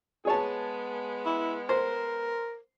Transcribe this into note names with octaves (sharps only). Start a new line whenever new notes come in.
G#3 B3 G#4 C#5 A5
E4
A#4 C5